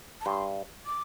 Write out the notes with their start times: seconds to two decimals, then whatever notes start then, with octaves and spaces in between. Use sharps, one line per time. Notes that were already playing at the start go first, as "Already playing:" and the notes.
0.21 A5
0.26 G2 C6
0.86 D6